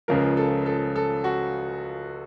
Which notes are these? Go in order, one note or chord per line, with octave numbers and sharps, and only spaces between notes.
C#2 C#3 F3 A#4
A4
A4
A4
F#4